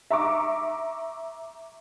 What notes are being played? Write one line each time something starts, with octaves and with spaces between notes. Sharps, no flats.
E5 A#5 C#6 D6